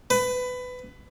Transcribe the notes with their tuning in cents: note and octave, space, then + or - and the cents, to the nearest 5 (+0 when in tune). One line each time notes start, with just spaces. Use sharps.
B4 +20